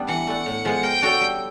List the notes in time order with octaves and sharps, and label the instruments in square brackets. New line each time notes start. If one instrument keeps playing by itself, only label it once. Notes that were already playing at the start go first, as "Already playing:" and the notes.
Already playing: [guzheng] G3 B3 D4
[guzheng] E3 [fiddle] F#5
[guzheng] A3 D4
A2
F3 G#3 B3
[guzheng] A#3 [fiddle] G5
[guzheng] D4 F#4 A4 C#5
G3